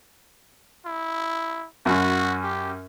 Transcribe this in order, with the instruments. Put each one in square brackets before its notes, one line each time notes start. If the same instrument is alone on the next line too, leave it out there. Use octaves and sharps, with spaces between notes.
[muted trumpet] E4
[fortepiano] F#2 C#4 [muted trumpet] F#4
[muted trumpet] G4